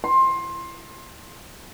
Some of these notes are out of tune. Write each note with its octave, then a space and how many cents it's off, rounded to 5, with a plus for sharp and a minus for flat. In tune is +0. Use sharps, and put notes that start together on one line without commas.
C6 +20